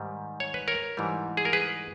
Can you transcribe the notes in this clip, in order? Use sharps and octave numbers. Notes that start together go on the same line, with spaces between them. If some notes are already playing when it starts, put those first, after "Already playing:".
Already playing: G#2 D#3 G3
C#5
B4
A#4 C#5
G#2 E3 G3
G#4
A#4
G#4 B4